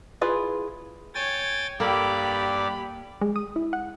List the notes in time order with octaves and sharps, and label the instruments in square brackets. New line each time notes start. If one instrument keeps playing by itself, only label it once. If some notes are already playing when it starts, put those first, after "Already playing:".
[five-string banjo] E4 F4 G#4 B4
[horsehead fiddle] C#5 [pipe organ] G5 G#5 A6
[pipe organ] G2 D5 [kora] A#3 A4 [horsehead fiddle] G4 B5
[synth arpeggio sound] G#3
D#6
E4
F#5